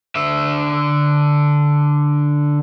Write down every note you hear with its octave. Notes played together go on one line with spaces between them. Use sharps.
D3 E5